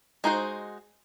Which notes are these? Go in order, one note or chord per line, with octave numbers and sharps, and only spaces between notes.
G#3 D#4 F#4 C5